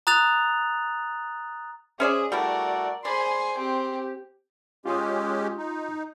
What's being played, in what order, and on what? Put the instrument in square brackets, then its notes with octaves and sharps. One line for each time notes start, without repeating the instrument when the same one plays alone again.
[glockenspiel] A#5 D#6 F#6 A6 F7
[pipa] C#4 C5 D5 [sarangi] G#4 [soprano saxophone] E5
[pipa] G3 A3 E4 [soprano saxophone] F#4 [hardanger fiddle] A#4 [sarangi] D5
[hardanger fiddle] G#4 C5 [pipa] D5 [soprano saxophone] B5 [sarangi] C6
[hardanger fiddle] C4 [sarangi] G4 [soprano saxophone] C6
[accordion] G#3 C#4 G4 [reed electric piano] F4 C6 D#6
[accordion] D#4